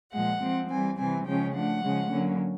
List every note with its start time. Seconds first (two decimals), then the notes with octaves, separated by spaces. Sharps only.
0.13 A#2 F3 G#3 F#5
0.41 F3 G#3 C4
0.70 E3 G3 C4 G#5
0.98 C3 E3 G3 C4 G#5
1.26 C#3 F3 G#3 C#4 G5
1.54 F3 A3 D4 F#5
1.83 C#3 F3 G#3 C#4
2.11 D3 F#3 A#3 C#4